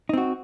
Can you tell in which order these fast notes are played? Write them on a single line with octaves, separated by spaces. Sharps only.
D#4 C4 F#4